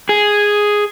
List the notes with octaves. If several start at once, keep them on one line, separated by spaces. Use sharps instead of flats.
G#4